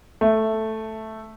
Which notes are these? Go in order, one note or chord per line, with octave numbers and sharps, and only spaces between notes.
A3